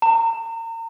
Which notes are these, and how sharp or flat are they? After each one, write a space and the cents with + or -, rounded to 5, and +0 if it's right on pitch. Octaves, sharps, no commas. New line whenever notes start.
A#5 -35